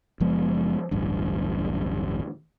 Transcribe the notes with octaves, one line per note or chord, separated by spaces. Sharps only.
F#1 F3 G#3 B3
D1 A1 G2